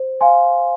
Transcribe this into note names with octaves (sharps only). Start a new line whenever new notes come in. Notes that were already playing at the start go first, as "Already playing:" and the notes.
Already playing: C5
F5 G#5 C6